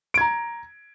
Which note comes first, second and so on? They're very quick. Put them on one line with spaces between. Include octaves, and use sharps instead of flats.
D7 G#6 A#5